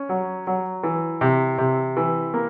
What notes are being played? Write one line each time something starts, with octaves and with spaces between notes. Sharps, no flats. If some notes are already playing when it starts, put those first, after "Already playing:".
Already playing: C#4
F#3
F#3
E3
C3
C3
E3
A#3